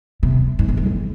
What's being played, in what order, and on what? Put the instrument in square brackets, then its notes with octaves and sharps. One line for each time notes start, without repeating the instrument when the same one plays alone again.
[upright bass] C3
G#2
G2
F2
G2